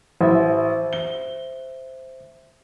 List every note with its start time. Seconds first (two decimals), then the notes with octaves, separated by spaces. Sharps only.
0.21 A1 C5 E5
0.93 G7